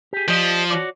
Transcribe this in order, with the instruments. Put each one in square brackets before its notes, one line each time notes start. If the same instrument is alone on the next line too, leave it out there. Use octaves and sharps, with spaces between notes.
[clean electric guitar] G4 G#4
[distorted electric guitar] F3 [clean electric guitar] G4 D5 D#5
[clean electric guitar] F#4 C#5 D5